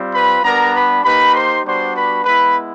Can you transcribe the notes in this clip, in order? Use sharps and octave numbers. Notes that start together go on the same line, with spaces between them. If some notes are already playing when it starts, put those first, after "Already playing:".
Already playing: G3 C4 F4
B4 B5
G3 B3 D4 A#4 A#5
B4 B5
A#3 D#4 G4 B4 B5
C5 C6
G3 B3 D4 F#4 C5 C6
B4 B5
G#3 B3 E4 B4 B5